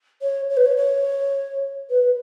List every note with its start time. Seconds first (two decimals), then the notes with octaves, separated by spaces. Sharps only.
0.22 C#5
0.49 C#5
0.57 B4
0.65 C#5
0.77 C#5
1.90 B4